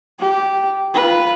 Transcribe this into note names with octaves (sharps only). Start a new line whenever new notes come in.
G4
F4 B4